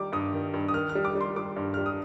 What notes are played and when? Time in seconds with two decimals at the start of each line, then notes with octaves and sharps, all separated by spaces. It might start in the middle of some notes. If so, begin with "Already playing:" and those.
Already playing: D#3 G3 D6
0.12 G2 D#6
0.33 D#3
0.54 G2
0.69 D#6
0.74 D#3 F6
0.89 F6
0.95 G3
1.05 D6
1.15 G3
1.21 C6
1.36 G3 D6
1.56 G2
1.74 G3 F6
1.86 D#6